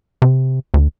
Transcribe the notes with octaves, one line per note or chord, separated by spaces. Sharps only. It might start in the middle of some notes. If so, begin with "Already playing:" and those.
C3
D2